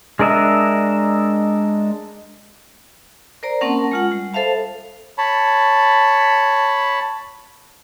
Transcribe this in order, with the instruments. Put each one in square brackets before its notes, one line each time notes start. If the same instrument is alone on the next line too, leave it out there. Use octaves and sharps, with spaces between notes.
[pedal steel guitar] G#3 D4 A#4 D#5 E5
[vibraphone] A#4 C5 D5 A#5
A#3 C4 C#4 A#4 F#5 A5
G#3 F4 F#5
G3
A4 C5 E5 F5 A5 B5
[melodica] C#5 A5 B5